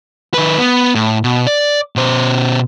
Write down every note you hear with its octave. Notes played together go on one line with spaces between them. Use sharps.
D#3 B4
B3
A2
B2
D5
B2 C5